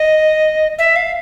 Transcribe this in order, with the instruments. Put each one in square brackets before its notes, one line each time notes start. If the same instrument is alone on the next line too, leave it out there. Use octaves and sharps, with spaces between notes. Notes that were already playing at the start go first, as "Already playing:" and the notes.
Already playing: [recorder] D#5
E5
F5